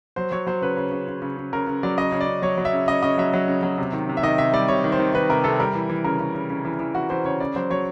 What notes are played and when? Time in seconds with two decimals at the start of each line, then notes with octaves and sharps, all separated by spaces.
0.16 F#3 C5
0.32 F#3 C#5
0.46 F#3 C5
0.62 C#3 B4
0.77 C#3
0.91 C#3
1.08 C#3
1.22 C#3
1.37 C#3
1.53 C#3 A#4
1.67 C#3
1.83 F#3 D5
1.98 C#3 D#5
2.12 C#3
2.21 D5
2.27 C#3
2.42 F#3 C#5
2.58 F#3
2.65 E5
2.73 C#3
2.88 C#3 D#5
3.03 C#3 D#5
3.18 F#3 E5
3.33 F#3
3.48 C#3
3.63 F#3
3.78 C3
3.93 D#3
4.09 C3
4.17 E5
4.23 D#3 D#5
4.38 C3 E5
4.53 G3 D5
4.68 C3 C#5
4.84 D#3
4.92 C5
4.99 D#3
5.14 D#3 B4
5.29 C3 A#4
5.44 C3 A4
5.60 G3 A#4
5.75 E3
5.90 E3
6.04 C#3 A#4
6.20 C#3
6.35 C#3
6.50 C#3
6.65 E3
6.80 E3
6.94 E3 F#4
7.10 E3 C5
7.25 C#3 C#5
7.40 C#3 D5
7.56 F#3 C5
7.70 F#3 C#5